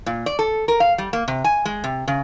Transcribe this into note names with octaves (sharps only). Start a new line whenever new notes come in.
A#2
D5
A4
A#4
F5
G3
A#3
C3
G#5
G#3
C3
C#3